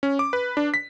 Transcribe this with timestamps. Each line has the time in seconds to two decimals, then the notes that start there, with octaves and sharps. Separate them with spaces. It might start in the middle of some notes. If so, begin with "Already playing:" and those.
0.03 C#4
0.19 D6
0.33 B4
0.57 D4
0.74 B6